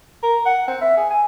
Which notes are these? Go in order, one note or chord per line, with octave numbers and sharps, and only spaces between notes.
A#4
F#5
C4
E5
G#4
G#5